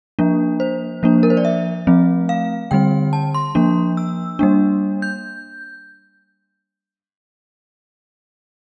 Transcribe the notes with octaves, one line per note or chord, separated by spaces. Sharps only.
F3 A#3 D4
C5
F3 A#3 D4
A#4
C5
D5
E5
F3 A3 C4
F5
D3 G3 C4 G5
A5
C6
F3 A#3 D4
E6
G3 A#3 D4
G6